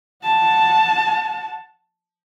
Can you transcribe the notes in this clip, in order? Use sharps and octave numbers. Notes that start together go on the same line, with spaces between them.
F#5 A5